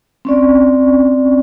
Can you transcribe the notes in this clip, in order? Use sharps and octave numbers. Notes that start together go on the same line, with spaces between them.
C4 C#4 D5